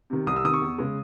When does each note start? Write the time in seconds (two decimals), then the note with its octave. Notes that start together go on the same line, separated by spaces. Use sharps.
0.10 C3 D#3
0.27 C2 D#6
0.36 E6
0.45 C3 D#3 D#6
0.53 C#6
0.62 E2
0.78 C#3 G#3